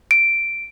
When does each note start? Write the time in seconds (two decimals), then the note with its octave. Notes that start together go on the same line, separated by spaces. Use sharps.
0.11 D7